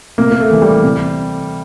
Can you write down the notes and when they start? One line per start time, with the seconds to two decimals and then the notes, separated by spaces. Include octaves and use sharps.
0.18 C3 A#3
0.31 A#3
0.40 A3
0.51 E3 G3
0.62 G3
0.83 C3